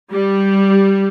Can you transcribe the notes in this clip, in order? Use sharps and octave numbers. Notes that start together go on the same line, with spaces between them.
G3